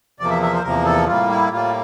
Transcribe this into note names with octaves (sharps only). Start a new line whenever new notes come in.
E2 C3 F3 A#3 D5
E5
E5
C5
E2 C3 F3 A#3 A#4
A4
A2 G3 A#3 F4
E4
A2 G3 A#3 F4